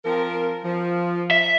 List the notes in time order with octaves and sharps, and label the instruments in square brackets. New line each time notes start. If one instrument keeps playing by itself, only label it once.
[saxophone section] F3 C4 A#4
F3
[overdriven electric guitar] E5